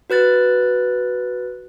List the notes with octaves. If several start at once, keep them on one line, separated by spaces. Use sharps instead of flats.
F#4 B4 F#6 A6